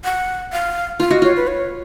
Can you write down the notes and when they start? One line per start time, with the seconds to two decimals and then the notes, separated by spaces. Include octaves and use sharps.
0.04 F#5
0.53 F5
1.00 F4 F5
1.11 F#4 D#5
1.22 F4 C#5
1.36 B4
1.47 C#5